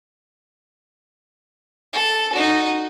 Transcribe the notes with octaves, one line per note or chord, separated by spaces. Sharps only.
A4
D#4 F#4